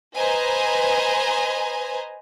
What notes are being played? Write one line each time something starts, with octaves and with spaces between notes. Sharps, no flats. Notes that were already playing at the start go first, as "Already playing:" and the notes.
B4 C5 D#5 G#5 A#5